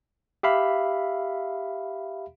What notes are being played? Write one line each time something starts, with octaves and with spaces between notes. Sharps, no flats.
G4 E5 F5 B5